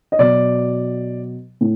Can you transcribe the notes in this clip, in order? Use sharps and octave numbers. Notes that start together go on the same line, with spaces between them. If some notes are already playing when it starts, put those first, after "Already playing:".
D#5
B2 F#3 D5
A2